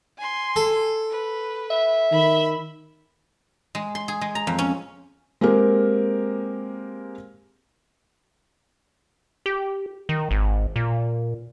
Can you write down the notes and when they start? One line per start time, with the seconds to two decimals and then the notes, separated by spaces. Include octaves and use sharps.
0.18 G#5 C6
0.56 A4
1.11 B4
1.70 E5
2.12 D#3 B5 E6
3.75 G#3
3.95 C6
4.08 G#4
4.21 G#3
4.35 A#5
4.47 F2
4.59 C#4
5.41 G#3 A#3 C4 G4 A#4
9.46 G4
10.09 D#3
10.31 G#1
10.76 A#2